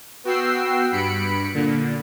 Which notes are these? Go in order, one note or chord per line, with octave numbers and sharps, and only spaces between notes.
B3 F#4 G5 E6 C7
G2 B5 C#7 D7
A#2 D3